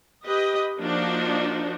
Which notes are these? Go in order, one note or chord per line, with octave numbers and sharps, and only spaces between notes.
G4 B4 D#5
F3 A#3 D4 D#4 F#4